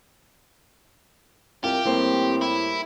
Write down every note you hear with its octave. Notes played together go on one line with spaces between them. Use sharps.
C2 F4 G4 A#4 G#5
A2 G3 A#3 C4 C5
E4